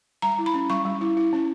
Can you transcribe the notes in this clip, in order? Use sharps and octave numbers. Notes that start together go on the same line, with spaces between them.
G3 A#5
E4
B5
C#4
G3 C#6
G3
E4
E4
C#4